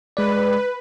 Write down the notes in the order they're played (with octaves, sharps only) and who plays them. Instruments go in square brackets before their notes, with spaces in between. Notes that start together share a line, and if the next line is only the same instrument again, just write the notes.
[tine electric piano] G#3 D5 [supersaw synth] B4